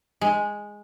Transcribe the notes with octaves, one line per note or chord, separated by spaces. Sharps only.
G#3